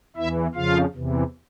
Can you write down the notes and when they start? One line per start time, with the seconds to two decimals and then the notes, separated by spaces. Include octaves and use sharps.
0.16 E2 E3 E4 E5
0.54 F2 C#3 F3 F4 F5
0.93 E2 C3 E3